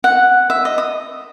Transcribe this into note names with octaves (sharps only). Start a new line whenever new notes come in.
F#5
E5
D#5
D#6